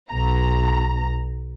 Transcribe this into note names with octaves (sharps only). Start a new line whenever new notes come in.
B1 A#5